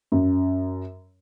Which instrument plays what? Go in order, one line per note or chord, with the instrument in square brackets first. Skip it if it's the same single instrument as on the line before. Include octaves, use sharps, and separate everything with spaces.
[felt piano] F#2